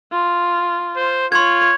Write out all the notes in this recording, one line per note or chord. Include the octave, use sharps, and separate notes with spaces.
F4
C5
F4 C#5 C6 G#6